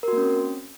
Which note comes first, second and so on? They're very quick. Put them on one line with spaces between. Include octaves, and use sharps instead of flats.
A#4 F#4 A#3 C#4 C4